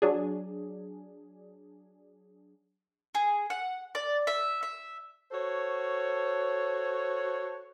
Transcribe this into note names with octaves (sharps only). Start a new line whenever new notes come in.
F#3 D4 G#4
G#4
F#5
D5
E5
E5
F#4 A4 C5 C#5